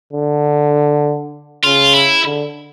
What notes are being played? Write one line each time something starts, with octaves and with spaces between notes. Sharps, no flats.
D3
C#3 F4
E4
D3